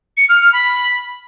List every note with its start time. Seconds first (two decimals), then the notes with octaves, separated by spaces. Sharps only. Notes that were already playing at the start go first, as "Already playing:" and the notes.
0.17 C#7
0.29 F6
0.41 F6
0.53 B5